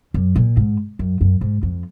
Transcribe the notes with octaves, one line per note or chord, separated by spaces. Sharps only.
F#2
A#2
G#2
F#2
F#2
G#2
F2